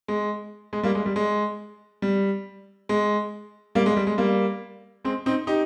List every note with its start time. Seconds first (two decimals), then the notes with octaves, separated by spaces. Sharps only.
0.08 G#3
0.73 G#3
0.83 G3 A#3
0.95 G#3
1.06 G3
1.16 G#3
2.02 G3
2.89 G#3
3.75 G3 A#3
3.86 G#3
3.96 G3
4.07 G#3
4.18 G3 A#3
5.05 G#3 C4
5.26 C4 D#4
5.47 D#4 G4